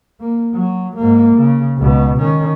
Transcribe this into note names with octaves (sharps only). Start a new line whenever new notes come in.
A#3
F#3
G#2 A#3
C#3
C#2 B2
D#3 C#4